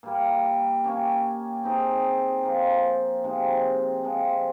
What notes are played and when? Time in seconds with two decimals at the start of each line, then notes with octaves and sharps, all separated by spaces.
0.03 A#2 G3 A#3
0.84 A#3 C#4 G4 C#5
1.63 C4 D#4 G#4 D#5
2.43 F3 A#3 F4 C5
3.24 C3 F3 G#3 D#4
4.03 C3 F3 G#3